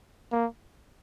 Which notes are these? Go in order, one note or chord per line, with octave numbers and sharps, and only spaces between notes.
A#3